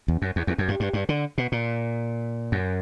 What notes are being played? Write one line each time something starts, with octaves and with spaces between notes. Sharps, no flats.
E2
F#2
E2
E2
F#2
G2
G2
G2
D3
B2
A#2
F#2